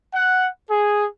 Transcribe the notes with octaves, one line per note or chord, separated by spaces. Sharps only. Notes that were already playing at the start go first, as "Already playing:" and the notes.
F#5
G#4